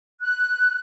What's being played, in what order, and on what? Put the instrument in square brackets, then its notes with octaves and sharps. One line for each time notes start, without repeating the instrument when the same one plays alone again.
[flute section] F#6